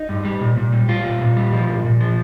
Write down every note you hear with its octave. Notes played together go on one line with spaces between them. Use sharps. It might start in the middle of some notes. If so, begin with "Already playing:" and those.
Already playing: D#4
G2
G3
A#2
A#2
G3
G3 F4
A#2
A#2
G3
F3
A#2
A#2
F3